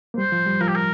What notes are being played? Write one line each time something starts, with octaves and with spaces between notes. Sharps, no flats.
A#3
G3 C5
F3
G3
F3 A#4
G4
A#4